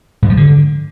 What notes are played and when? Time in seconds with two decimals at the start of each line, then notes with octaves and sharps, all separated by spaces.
0.22 G#2
0.30 F3
0.37 D3